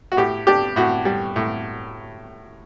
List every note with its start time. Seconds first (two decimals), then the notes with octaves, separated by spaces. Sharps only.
0.12 F#4
0.17 A2 G4
0.47 D4 G4
0.76 A2 F#4
1.05 G3
1.36 A2